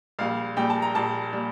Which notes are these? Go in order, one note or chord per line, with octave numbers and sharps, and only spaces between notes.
A#1 A#2 G3 F5
A#1 A#2 G3 G5
A5
A#5
A#1 A#2 G3 A5
A#2 G3